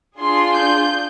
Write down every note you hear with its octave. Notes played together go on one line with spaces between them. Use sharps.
D4 F4 G#4 C6
G6